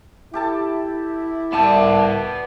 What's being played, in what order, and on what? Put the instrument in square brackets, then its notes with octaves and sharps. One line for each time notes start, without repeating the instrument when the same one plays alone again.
[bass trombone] E4 [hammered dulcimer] G4 A4 A5
[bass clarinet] C2 [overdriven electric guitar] B3 A5 [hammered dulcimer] D5 E5 G5